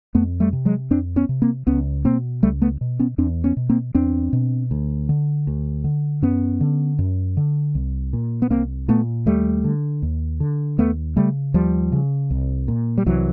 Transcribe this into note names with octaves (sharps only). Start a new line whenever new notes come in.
F2 A3 B3
G3 A3
C3
F#3 G#3
F2 C4 D4
B3 C#4
C3
A#3 C4
C#2 B3 C#4
B2 A#3 C4
C#2 G3 A3
A3 B3
B2
B3 C#4
E2 C4 D4
B3 C#4
B2
A#3 C4
E2 C4 D4
B2
D2
D3
D2
D3
F#2 B3 C#4
D3
F#2
D3
C2
A#2
B3
C2 A#3 C4
A#2 A3 B3
D#2 G3 A3
D3
D#2
D3
D#2 A3 B3
C#3 G3 A3
D#2 F3 G3
C#3
C2
A#2
G3
C2 E3 F#3